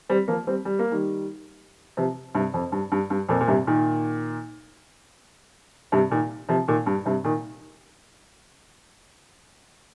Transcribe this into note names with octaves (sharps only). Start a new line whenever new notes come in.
G3 C4
F3 A#3
G3 C4
G3
A#3
D#3 G3
C3 F3
G2 C3
F2
G2
G2
G2
F2 A#2
A#2
G2 C3
A#2 D#3
G2 C3
A#2 D#3
C3 F3
A#2 D#3
G2
G2 C3
A#2 D#3